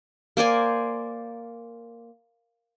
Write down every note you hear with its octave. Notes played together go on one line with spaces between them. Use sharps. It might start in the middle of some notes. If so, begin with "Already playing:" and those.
A#3 C5 D5 G#5